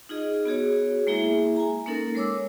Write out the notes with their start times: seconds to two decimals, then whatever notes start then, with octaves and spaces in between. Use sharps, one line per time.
0.09 D#4 F4 G#4 D#5
0.45 B3 F#4 G#4 C#5
1.07 G#3 A#3 E4 G#4 E5
1.56 G#5 A#5
1.86 A#3 C#4 D#4 A4 A#4
2.15 G#3 A#4 C#5 D6 E6